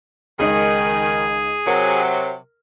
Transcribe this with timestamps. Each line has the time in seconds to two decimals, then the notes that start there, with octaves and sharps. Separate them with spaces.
0.39 C#2 D#3 D#4 G#4 D#5 G#5
1.67 C3 F#3 A#4